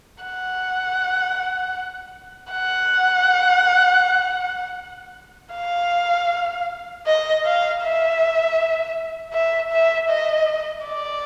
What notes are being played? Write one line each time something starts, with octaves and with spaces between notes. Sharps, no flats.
F#5
F#5
F5
D#5
F5
E5
E5
E5
D#5
D5